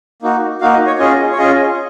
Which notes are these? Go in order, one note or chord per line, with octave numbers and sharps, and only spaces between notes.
A#3 D#4 F#4
A#3 D#4 F#4 F5
D#5
C#5
C#4 F4 G#4 D#5
C#5
C#4 F4 G#4 D#5